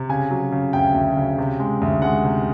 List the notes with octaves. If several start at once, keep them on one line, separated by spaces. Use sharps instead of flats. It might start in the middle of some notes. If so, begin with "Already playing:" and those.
Already playing: C3
C#3 G#5
F#3
C#3
D2 G5
D2
C#3
C3
G#3
D2
G#3 F#5
C3